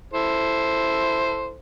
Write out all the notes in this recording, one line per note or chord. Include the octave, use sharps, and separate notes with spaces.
E4 A4 C5